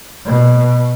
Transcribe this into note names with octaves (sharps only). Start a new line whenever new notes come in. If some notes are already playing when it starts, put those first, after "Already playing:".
B2